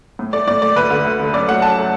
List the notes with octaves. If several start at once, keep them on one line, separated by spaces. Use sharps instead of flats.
A2
A3 D5
A2 D5
A3 D5
D2 B4
D3 A3
D2
D3 A3
F#2 D5
F#3 A3 F#5
F#2 A5
F#3 A3